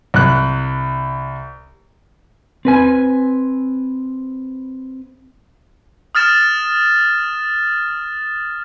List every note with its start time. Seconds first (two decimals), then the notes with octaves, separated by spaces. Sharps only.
0.14 C2 F#6
2.65 C4 B4 G#5
6.15 D#6 F6 A6 E7